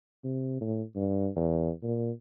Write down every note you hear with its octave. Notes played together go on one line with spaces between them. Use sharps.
C3
A2
G2
E2
A#2